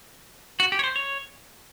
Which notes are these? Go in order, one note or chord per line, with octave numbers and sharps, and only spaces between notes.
F#4
G4
C#5
C5
C#5